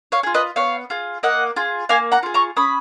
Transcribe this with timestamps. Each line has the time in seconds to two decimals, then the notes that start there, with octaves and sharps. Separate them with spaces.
0.12 C#5 F5
0.23 F4 G#4
0.34 B4 D#5
0.56 B3 C#5 F5
0.90 F4 G#4
1.23 A#3 D#5 F#5
1.56 F4 G#4
1.89 A#3 F5 G#5
2.12 F#5 A#5
2.23 F4 G#4
2.34 A#5 C#6
2.56 C#4 B5 D#6